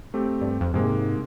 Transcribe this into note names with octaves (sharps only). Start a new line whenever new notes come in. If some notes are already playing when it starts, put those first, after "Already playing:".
A3 C4 G4
G2
F2
G#2 C3 G#3 A#3